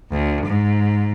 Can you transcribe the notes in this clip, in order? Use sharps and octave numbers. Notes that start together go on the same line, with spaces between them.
D2
G#2